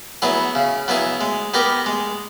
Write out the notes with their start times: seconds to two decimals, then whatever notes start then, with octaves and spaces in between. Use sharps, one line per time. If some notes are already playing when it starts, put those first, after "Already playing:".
0.22 F#3 B3 E4 G#4
0.55 C#3
0.88 F#3 B3 E4 G#4
1.21 G#3
1.54 B3 D#4 G4 A#4
1.86 G#3